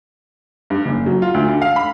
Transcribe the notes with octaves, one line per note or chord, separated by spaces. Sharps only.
G2
F#1
F#3
F4
D2
D3
F5
B5